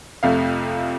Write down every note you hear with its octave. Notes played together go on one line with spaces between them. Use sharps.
F2 C3 F3 A3 F5